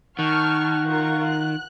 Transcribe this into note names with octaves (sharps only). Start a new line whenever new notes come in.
D#3 F#5 A5 C#6 F6
F4 A#4 C#6
F#6